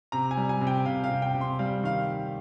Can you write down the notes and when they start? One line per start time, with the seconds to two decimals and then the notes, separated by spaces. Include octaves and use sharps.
0.12 C3 A#5
0.31 G#5
0.37 G3
0.49 G#5
0.61 C3
0.67 G5
0.85 C3 F5
1.04 F5
1.10 C3
1.22 G5
1.34 C3
1.41 C6
1.59 G3 F5
1.83 D#3 F5